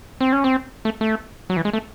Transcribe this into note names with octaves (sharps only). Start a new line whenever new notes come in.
C4
C#4
C4
A3
A3
F#3
E3
G#3
A3